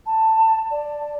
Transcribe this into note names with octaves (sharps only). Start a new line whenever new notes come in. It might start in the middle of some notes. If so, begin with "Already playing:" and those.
A5
D5